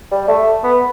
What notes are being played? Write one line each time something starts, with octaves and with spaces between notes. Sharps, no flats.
G3
A3
B3